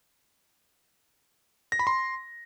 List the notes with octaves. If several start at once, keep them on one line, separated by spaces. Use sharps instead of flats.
A#6
B5
C6